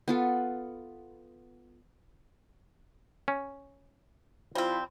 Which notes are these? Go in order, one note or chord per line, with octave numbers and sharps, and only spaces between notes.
B3 F4 A4
C#4
F3 G3 C4 E4 F4